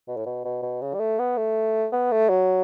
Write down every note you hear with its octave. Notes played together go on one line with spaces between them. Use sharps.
B2
A2
B2
B2
B2
C#3
G3
A3
B3
A3
B3
A3
F#3